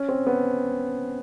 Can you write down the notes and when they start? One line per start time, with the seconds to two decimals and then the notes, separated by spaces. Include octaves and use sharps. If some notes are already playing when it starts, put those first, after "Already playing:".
Already playing: C#4
0.09 C4
0.26 B3